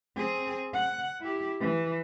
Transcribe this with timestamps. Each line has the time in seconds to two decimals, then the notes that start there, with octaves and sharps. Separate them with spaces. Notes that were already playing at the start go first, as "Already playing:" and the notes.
0.16 C4 G#4
0.73 F#5
1.21 E4 G4
1.60 E3